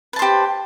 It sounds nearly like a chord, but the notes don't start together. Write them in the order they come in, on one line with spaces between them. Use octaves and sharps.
B4 A5 C5 G4